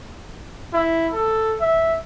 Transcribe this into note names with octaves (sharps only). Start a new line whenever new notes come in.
E4
A4
E5